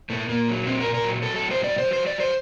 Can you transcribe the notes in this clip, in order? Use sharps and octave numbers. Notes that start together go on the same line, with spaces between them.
A#2 A3
A#2 A#3
F#3
A#2 C4
A#2 A#4
A#4
F#3
F#3 A4
A4
A2
C5
F#3 D5
F#3 C5
F#3 C5
D5
F#3 C5